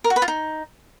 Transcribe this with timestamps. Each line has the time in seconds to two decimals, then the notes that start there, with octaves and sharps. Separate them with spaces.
0.04 A#4
0.10 F#4
0.16 B4
0.22 F4
0.28 D#4